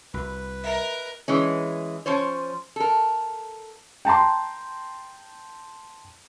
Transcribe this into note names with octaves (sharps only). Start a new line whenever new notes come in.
C2 F#4 A#4 B4 B5
A#4 D#5 E5 A#5
E3 G#3 C#4
F3 C#4 C5 C#5
A4 A#4
G5 A5 A#5 C6